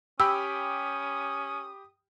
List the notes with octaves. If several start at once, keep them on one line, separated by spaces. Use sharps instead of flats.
C#4 G4 G5 B5 D#6 E6